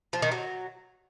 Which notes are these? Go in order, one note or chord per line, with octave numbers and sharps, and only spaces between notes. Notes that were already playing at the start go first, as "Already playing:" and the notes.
F3
D#3
F#3